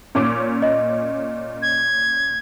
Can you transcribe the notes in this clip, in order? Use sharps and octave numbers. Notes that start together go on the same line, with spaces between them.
A#2 C#4 D6
D#5
G#6